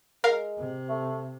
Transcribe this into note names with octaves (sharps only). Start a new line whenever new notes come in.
G#3 A#4 F5
C3
A3